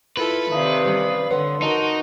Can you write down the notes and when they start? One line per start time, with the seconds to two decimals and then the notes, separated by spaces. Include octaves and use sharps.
0.17 E4 F4 A4 B4
0.51 C3 D#3 D5 E5 F5 A5 A#5 D#6
0.84 E3 G3 C#4
1.30 D3 B4 C#5 F#5 C6
1.62 D#4 F#4 A#4 A5